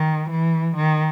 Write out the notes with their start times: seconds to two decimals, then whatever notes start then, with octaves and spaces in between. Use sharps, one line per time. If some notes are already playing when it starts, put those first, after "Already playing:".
Already playing: D#3
0.30 E3
0.76 D#3